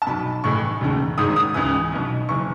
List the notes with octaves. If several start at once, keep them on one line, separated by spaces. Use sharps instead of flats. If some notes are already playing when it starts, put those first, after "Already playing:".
A5
B1 B2 B5
A1 A2 E3 C#6
E1 D#2 C#3
G#1 G#2 D#3 D#6
D#6
C#2 C#3 E3 D#6
B1 B2
F#1 E3 C#6